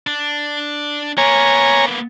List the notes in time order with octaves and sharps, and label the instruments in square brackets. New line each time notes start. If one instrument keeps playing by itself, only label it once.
[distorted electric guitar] D4
[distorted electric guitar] A#3 B3 [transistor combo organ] C#5 G#5 A#5